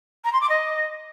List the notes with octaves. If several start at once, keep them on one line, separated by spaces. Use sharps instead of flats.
A#5
C6
D6
D#5